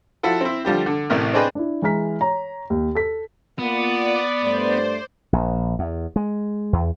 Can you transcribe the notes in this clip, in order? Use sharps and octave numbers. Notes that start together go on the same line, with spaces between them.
F3 E4 F#4 A4
C4 E4
D3 F3 G3 G4
D3
A1 A2 C3 A#4
C4 D4 G#4 B4 D#5 G5
D4 E4
E3 G#3 A#5 F6 B6
C#5 A#5
D#2
A4 B6
A#3 B3 F4 D5 F#5
G2 A3 C5 D5
A#1
E2
G#3
E2